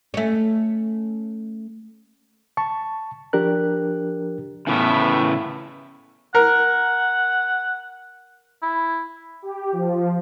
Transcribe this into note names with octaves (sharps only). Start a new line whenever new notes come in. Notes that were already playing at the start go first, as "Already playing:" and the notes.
A3 C#4
A5 C#6
F3 D4 G4 A#4 F#6
A2 C#3 E3 B3 E5
A#4 F#5
E4
G4
F3